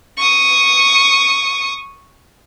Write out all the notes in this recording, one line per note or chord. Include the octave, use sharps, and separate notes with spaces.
C#6 D#6